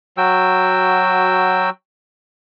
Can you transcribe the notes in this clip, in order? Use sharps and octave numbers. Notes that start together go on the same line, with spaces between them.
F#3 F#4 G5 E6